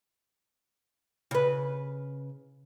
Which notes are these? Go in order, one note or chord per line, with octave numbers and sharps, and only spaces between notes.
C#3 B4